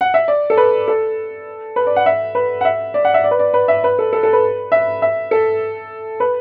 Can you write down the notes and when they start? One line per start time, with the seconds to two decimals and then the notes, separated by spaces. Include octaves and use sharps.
0.01 F#5
0.14 E5
0.28 D5
0.50 A4
0.57 B4
0.88 A4
1.76 B4
1.87 D5
1.96 F#5
2.06 E5
2.35 B4
2.61 F#5
2.65 E5
2.94 D5
3.05 F#5
3.14 E5
3.24 D5
3.31 B4
3.39 D5
3.54 B4
3.68 E5
3.84 B4
3.99 A4
4.13 A4
4.23 A4
4.33 B4
4.72 E5
5.02 E5
5.31 A4
6.20 B4